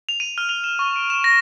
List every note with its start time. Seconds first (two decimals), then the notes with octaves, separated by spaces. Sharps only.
0.09 F7
0.20 D#7
0.38 F6
0.49 F7
0.64 E7
0.79 C#6
0.96 D7
1.10 E7
1.24 A#6